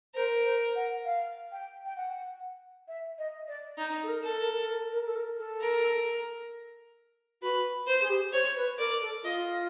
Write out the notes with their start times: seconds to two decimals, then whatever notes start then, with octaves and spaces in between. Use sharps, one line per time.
0.14 A#4 C5
0.45 C5
0.76 F#5
1.05 F5
1.52 G5
1.85 G5
1.96 F#5
2.88 E5
3.18 D#5
3.48 D5
3.78 D#4
4.03 A4
4.08 A#4
4.23 A4
4.40 A#4
4.69 A#4
4.92 A#4
5.06 A4
5.15 A#4
5.38 A4
5.61 A#4
7.42 F#4 B4
7.87 C5
8.01 G#4
8.10 G4
8.33 C5 C#5
8.56 B4
8.78 A#4 D5
9.01 A4
9.23 F4 D#5